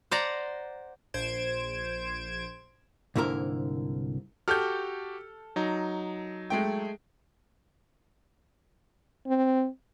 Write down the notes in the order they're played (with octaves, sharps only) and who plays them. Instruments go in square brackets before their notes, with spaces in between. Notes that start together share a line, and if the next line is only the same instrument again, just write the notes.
[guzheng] C5 D5 F#5 A#5
[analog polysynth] A#1 C5 G#6 D7 E7
[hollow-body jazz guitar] C2 G#2 D3 A#3 E4 A#4
[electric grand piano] F#4 G4 F6 [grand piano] A4 G6
[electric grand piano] F#3 D#4
[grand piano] G#3 A3 G5
[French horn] C4